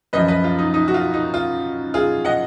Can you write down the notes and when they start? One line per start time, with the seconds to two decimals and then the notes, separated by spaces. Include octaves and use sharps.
0.13 F#2 F3 B4 D#5
0.28 B4 D#5
0.44 F4
0.58 D#4
0.74 D#4
0.88 F#4
0.94 F4
1.14 D#4
1.34 F4
1.94 F4 G#4
2.25 D#5 F#5